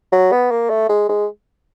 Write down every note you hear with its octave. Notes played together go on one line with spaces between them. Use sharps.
F#3
B3
A#3
A3
G#3
G#3